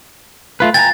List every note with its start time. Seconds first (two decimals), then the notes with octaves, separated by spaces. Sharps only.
0.60 A3 F4 B4
0.74 G5 G#5 A#5 A6